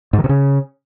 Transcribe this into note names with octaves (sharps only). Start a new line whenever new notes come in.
G#2
D#3
C3
C#3